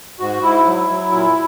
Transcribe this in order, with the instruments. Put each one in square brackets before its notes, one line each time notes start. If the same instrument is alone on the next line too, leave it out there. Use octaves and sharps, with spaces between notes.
[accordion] G#2 F#4
G#2 E4
F#3
F#3
A#2